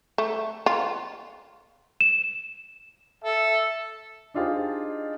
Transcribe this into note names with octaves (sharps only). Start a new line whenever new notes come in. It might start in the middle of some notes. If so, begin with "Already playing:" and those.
A3
F4
E7
A4 E5
D4 D#4 F4 G4 G#4 C5